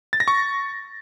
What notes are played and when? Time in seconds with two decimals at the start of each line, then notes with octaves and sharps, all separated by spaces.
0.13 A6
0.20 A#6
0.28 C#6